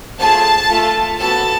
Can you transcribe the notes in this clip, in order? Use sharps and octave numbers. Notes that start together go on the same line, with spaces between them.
A3 F4 G#4 A5
A3 F4 A4
B3 F#4 A4 A5